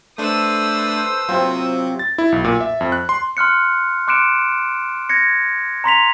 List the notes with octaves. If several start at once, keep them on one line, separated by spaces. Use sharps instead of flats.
A3 D4 A4 B4 C5 D#6 E6
C3 F#3 C4 F4
A6
E4
B1
A#2
E5
F2
F#6
C6
C6 F6 F#6 C#7
C6 D6 F#6 C#7 D7 E7
G#6 A#6 C#7
A#5 C6 B6 F7